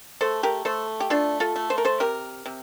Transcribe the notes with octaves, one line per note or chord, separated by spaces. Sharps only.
A3 A4 C5
G4 A#4
A3 A4 C5
G4
A3 D4 F4
F4 A4
A3
C5
A#4
A4 C5
C3 G4 A#4
C3